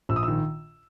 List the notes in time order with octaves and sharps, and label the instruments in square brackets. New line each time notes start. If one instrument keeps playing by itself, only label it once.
[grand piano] A#1 E6
D#6
D#3 E6